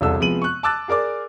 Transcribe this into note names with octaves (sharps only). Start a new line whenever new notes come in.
E1 C2 A4 E6
C3 F3 G#3 B3 D#7 F#7
C#6 F#6
A5 D6 E6 F#6 A6
G#4 A#4 D5 D6